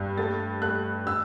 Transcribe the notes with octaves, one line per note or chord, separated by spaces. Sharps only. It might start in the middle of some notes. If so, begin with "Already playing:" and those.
Already playing: G2
A3 A6
A3 F#6
E6